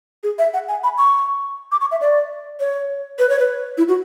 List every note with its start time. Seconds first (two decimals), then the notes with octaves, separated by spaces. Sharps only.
0.23 G#4
0.39 E5
0.54 F#5
0.68 G#5
0.84 B5
0.98 C#6
1.72 D6
1.81 C#6
1.91 E5
2.01 D5
2.60 C#5
3.19 B4
3.29 C#5
3.39 B4
3.78 E4
3.88 F#4